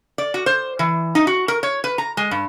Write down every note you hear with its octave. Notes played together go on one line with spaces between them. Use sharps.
D5
F#4
C5
E3
D#4
F#4
A#4
C#5
B4
A#5
G#3
G2